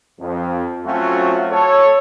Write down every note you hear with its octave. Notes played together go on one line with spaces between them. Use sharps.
F2
F#3 A3 C4 C#4 F4 F#4
A4 C#5